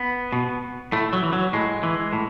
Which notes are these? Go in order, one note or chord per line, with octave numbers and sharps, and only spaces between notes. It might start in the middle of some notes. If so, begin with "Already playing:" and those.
Already playing: B3
B2
A2 A3
F#3
E3
F#3
A2 G#3
E3
A2